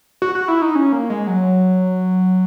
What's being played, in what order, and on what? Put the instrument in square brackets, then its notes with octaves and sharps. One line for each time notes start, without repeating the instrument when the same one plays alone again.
[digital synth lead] F#4
F#4
E4
D#4
C#4
A#3
G#3
F#3